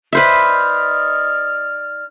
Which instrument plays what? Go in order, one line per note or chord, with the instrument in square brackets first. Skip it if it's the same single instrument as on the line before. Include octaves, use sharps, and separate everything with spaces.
[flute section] D#4 D5 F6 [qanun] B4 C5 E5